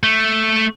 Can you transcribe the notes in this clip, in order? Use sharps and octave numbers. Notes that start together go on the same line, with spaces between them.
A3